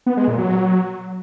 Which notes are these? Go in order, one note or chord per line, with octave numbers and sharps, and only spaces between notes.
B3
G#3
A#2
F#3